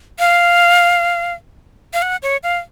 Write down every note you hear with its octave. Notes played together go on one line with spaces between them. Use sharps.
F5
F5
F#5
C#5
F5